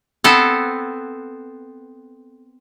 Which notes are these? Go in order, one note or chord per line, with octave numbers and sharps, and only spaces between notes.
B3 C4 A4